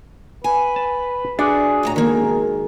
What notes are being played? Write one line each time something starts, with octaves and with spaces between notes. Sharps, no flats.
B4 G#5
A5
D4 E4 F#4 G#4
D2 A2 A#5
B2 D#3 G#3 A#3 A#4